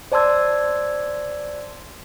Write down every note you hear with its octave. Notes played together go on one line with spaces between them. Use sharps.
C5 D5 A5 C6 E6 G#6